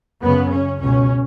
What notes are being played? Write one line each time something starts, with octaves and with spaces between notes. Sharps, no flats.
F#2 C#3 B3
C#4
C#2 B2 C#4